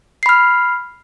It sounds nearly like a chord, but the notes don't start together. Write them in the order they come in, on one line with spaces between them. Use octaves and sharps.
C7 B5 F6